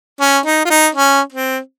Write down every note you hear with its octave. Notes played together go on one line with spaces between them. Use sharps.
C#4
D#4
F4
D#4
C#4
C4